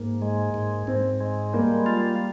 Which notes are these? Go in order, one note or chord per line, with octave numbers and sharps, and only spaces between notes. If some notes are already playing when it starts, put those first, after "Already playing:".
Already playing: G#2 A#3
G#3
G#2
G#2 C4
G#3
G3 A#3
F4